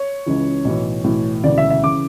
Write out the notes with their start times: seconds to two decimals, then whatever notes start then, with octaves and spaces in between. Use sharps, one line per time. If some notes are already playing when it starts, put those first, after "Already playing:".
Already playing: C#5
0.26 C#2 C#3 E3
0.65 B1 A2 E3
1.04 B1 A2 E3
1.43 E1 D2 C#3 E3 D5
1.58 E5
1.70 E5
1.83 C#3 E3 D6